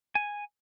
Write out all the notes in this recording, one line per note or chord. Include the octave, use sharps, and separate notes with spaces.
G#5